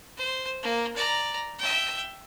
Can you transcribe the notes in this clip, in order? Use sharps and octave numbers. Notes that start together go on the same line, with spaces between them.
C5
A#3
D5 A#5
E5 G5